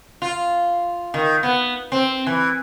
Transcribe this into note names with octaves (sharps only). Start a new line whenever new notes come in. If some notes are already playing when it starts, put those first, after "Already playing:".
F4
D#3
B3
C4
E3